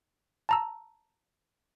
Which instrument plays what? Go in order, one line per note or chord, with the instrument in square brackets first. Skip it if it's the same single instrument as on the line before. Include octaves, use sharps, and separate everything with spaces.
[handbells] A5 A#5 E6